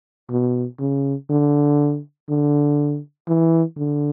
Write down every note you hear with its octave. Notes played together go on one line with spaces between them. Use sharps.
B2
C#3
D3
D3
E3
D3